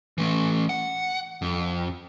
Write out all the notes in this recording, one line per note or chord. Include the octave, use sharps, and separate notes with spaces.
E3 A3
F#5
F2